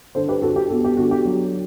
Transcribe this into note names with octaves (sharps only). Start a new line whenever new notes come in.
D3 A4 C5
G4 B4
D3 F#4 A4
G4
B3 F#4 A4
G4
D3 F#4
G4
F#3